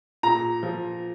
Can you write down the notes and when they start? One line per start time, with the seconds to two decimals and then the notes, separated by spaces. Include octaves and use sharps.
0.23 A#2 A#5
0.63 F3